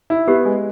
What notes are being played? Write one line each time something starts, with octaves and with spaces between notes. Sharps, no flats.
E4
B3 G4
G#3